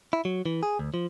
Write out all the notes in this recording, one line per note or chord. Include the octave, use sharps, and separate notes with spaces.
E4
F#3
E3
G#4
D2
F3